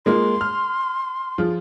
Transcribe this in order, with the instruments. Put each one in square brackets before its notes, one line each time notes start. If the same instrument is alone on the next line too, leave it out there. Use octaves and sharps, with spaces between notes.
[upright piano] G#3 A#3 F4 [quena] C6
[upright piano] F6
F3 F4 G#4